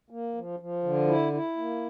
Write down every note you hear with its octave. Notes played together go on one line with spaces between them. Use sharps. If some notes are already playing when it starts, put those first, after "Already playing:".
A#3
F3
F3
D3
E4
E4
A#3